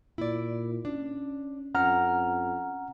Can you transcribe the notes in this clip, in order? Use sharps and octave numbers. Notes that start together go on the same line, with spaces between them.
A#2 E4 D5
C#4 D4
F2 C#4 F#5 A#5 F6